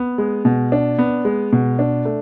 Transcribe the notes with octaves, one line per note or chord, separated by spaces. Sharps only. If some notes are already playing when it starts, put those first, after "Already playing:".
Already playing: B3
G#3
B2
D4
B3
G#3
B2
D4
A3